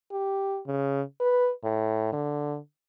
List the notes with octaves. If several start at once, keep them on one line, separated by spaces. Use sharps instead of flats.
G4
C#3
B4
A2
D3